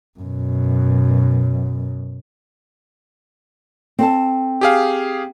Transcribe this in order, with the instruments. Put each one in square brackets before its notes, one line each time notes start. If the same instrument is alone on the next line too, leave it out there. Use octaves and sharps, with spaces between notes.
[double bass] F#2 B2
[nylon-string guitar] C4 A4 A5
[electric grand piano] G4 G#4 F5